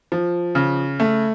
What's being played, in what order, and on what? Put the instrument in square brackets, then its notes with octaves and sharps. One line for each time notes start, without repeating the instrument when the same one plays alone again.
[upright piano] F3
C#3
A3